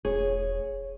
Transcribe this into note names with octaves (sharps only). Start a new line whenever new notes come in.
E1 G#4 C#5